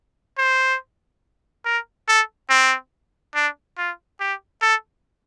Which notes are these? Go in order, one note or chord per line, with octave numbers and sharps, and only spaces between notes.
C5
A#4
A4
C4
D4
F4
G4
A4